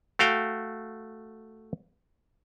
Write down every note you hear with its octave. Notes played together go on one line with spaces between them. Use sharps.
A3 F#4 F5 G5